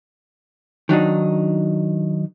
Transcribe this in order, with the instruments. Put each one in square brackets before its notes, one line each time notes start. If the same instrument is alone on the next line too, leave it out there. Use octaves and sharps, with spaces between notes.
[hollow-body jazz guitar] D#3 F#3 D4 D#4